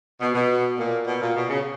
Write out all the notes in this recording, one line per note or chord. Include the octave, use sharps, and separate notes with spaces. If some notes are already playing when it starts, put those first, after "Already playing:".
B2
B2
A#2
B2
A#2
B2
C#3